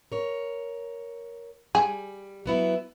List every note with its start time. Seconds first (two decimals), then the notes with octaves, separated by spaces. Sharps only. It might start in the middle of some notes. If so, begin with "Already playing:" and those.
0.12 A#4 C#5
1.75 G3 G#4
2.46 F#3 B3 E4